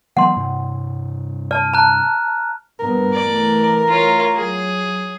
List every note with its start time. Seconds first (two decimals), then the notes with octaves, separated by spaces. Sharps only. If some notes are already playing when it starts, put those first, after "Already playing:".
0.17 E3 F#3 B3 F#5 C6
0.36 G2 C3
1.51 D5 A5 F6
1.74 A5 A#5 F#6
2.80 G2 A#2 B3 A#4
3.14 E3 A3 D5
3.89 F4 C#5
4.36 F#3 G#4